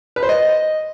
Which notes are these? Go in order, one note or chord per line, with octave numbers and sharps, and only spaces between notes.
B4
C5
D#5